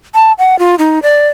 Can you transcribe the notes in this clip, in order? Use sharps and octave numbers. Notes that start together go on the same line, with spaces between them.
A5
F#5
F4
D#4
D5